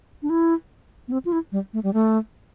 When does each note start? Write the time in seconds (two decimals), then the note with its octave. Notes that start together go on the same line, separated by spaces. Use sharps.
0.23 D4
0.30 E4
1.08 B3
1.12 C4
1.25 F4
1.32 E4
1.52 G3
1.73 A3
1.83 G3
1.94 A3